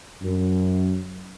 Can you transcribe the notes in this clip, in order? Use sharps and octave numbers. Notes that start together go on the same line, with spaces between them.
F#2